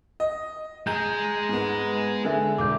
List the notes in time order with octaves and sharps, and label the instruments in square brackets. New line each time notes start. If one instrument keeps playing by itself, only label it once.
[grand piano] D#5
[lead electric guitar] G#3 G#4 [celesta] A#5 [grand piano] G6
[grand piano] G#2 B3
[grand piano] D3 [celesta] G#4 E5 G#5
[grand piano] E1 [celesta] D6 G6